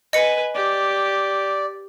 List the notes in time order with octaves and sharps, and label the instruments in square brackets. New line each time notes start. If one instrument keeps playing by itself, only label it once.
[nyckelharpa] B4 G#5 [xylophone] D#5 C#7
[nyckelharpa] G4 [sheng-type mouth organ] D5